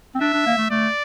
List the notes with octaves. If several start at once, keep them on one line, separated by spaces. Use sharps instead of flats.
C4
D4 E5
D4
A#3
A3
A3 D5